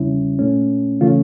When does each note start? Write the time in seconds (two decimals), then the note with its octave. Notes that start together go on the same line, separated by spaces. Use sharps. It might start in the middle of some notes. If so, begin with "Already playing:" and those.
Already playing: E2 C#3 G3 C#4 E4
0.39 A#2 A3 C#4
1.01 C#3 E3 A3 C#4 F4